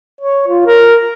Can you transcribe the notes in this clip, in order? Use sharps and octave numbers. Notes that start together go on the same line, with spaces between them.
C#5
F4
A#4